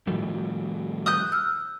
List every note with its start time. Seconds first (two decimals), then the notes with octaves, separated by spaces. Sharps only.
0.07 A2 D#3 F3 G3 F#4 A4
1.06 D#6 F#6 G6
1.32 E6 F6